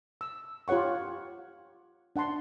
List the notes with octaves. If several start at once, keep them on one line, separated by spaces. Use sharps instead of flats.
E6
F4 G4 C#5 F#5 C#6
D4 F#5 A5 C6